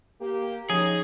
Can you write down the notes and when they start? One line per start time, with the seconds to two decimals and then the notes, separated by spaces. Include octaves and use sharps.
0.20 A#3 G4
0.70 F3 C#4 D#4 G#4 C#5